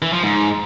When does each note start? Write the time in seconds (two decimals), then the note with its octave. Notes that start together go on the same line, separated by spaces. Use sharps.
0.02 E3
0.13 F3
0.24 G#2